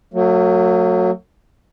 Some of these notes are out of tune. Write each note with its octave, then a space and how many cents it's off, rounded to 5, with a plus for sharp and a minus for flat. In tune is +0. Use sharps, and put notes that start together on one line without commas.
F#3 -15 A3 +40